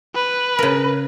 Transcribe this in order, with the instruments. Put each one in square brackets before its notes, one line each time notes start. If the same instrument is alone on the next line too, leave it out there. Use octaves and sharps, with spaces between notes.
[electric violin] B4
[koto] C#3 A#4